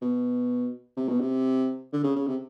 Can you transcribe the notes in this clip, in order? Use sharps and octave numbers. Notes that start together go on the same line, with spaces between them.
B2
C3
B2
C3
D3
C#3
C#3
C3